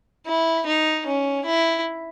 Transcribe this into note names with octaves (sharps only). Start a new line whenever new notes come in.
E4
D#4
C#4
E4